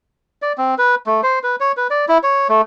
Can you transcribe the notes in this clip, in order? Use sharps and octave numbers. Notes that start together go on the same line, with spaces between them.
D5
C4
B4
A3
C5
B4
C#5
B4
D5
E4
C#5
A3